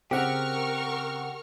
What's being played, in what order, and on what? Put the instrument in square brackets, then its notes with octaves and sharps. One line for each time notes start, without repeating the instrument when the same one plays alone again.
[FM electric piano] C#3 F#5 [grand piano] C4 [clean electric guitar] G4 [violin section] A#4 C#6 F6